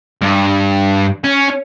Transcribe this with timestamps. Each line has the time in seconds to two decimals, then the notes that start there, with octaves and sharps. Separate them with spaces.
0.22 G2
1.24 C#4